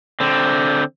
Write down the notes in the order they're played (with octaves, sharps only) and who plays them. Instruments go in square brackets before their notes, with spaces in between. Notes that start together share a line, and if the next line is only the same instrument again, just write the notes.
[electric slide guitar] D3 C4